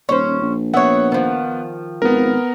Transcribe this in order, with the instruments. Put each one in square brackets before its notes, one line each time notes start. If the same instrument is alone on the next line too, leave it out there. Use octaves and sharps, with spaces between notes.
[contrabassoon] D#1 [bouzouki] C#4 C5
[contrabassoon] A#1
[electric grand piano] B3 F#5 [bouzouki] C#5 E5
[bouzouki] D#3 F3
[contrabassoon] G#1 [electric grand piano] B3 A#4